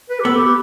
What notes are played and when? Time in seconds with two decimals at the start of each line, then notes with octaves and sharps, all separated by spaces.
0.09 B4
0.20 G4
0.24 B3 A4
0.35 G4
0.46 G4